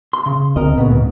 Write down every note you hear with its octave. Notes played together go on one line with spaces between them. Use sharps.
C6
C#3
C#2 D3 C4 A#4 D#5
D2 A#2 C#3 B3
G#2